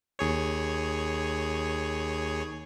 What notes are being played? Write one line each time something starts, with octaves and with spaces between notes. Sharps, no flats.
D#2 G#4 C#5